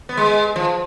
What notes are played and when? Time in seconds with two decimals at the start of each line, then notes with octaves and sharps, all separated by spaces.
0.09 B3
0.17 G#3
0.56 F3